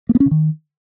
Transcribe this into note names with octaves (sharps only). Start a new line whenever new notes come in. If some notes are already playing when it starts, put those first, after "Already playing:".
A#3
B3
C#4
C#3
D#3